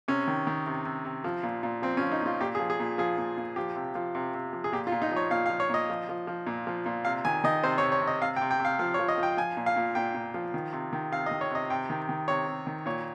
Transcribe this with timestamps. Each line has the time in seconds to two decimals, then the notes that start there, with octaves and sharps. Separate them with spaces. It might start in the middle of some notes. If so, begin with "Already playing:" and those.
0.08 C3 C#4
0.27 D#3
0.47 D#3
0.67 C3
0.85 C3
1.05 C3
1.24 F3
1.43 A#2
1.63 A#2
1.82 F3 C4
1.97 C#4
2.01 F3
2.12 D#4
2.21 A#2 F4
2.40 A#2 G4
2.55 G#4
2.59 F3
2.70 G#4
2.80 A#2
2.98 F3 G#4
3.18 A#2
3.37 A#2
3.56 F3 G4
3.75 C3
3.95 F3
4.15 C3
4.34 C3
4.53 F3
4.64 G#4
4.72 A#2 G4
4.87 F4
4.92 A#2
5.02 D#4
5.12 F3 C#5
5.31 A#2 F5
5.46 F5
5.50 F3
5.60 C#5
5.69 A#2 D#5
5.90 F3
6.09 F3
6.27 F3
6.47 A#2
6.67 F3
6.86 A#2
7.05 C3 F5
7.25 D#3 G#5
7.44 D#3 D#5
7.63 C3 C5
7.78 C#5
7.83 C3
7.92 C#5
8.01 C3
8.07 D#5
8.22 C3 F5
8.36 G5
8.41 C3
8.51 G5
8.60 C3
8.65 F5
8.79 F3 F5
8.94 C#5
8.99 F3
9.08 D#5
9.18 F3
9.23 G5
9.37 F3 G#5
9.57 A#2
9.66 F5
9.76 A#2
9.95 A#2 G5
10.14 A#2
10.34 F3
10.54 D#3
10.73 C3
10.93 D#3
11.12 C3 F5
11.26 D#5
11.31 D#3
11.41 C#5
11.50 C3 D#5
11.70 C3 G5
11.90 D#3
12.09 D#3
12.28 C3 C#5
12.47 C3
12.67 D#3
12.86 A#2 C#5